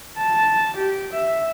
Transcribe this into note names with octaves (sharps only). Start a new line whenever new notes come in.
A5
G4
E5